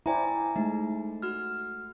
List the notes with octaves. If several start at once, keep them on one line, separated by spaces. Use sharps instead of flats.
E4 C5 D5 G5 G#5 A#5
G#3 A3 D#4
F#4 F6